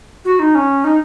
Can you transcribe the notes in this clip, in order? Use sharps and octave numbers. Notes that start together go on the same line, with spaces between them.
F#4
D#4
C#4
D#4